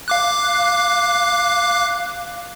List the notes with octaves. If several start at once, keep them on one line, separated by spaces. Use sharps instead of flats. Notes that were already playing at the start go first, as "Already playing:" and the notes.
F5 D6 F#6